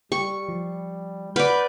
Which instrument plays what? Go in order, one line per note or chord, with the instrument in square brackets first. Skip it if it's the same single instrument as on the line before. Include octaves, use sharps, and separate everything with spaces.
[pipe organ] G3 [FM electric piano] G4 [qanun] C#6
[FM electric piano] F3
[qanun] B4 D5 [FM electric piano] F#5 B5 F6 [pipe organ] G6